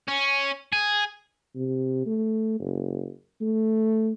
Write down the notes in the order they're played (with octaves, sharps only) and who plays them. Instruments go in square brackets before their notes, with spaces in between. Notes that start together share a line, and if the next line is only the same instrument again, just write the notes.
[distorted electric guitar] C#4
G#4
[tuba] C3
A3
F#1
A3